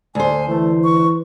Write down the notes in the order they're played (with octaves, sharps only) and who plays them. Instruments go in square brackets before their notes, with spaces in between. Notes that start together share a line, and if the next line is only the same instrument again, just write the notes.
[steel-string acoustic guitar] D2 C5 [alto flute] G#5
[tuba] E3 [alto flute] A3
[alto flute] C#6